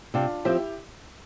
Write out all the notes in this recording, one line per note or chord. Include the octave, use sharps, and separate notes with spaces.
C3 D4 F4
F3 C4 E4 F4 G4